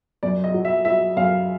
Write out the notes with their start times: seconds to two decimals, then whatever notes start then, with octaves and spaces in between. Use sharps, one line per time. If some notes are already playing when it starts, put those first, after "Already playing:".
0.23 F#2 D5
0.44 D#5
0.54 F#3
0.65 E5
0.85 F#3 E5
1.17 F#2 F5